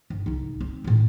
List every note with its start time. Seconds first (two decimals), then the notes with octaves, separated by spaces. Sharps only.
0.10 G1
0.26 C2 D#4
0.61 C4
0.84 A2 D#3